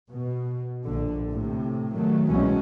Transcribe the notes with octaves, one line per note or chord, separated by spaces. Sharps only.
B2
A#1 D3
A2 C3
D#3 F#3 A3
C2 B2 E3 F#3 G#3 C#4